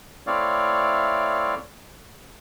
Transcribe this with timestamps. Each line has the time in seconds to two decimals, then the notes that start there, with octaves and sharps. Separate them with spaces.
0.27 A3 C4 E4 C#5 D5 F5